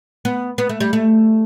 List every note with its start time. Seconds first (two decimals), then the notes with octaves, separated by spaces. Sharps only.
0.25 B3
0.58 B3
0.69 A3
0.80 G3
0.93 A3